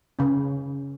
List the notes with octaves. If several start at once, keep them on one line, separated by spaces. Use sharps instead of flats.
C#3 C#4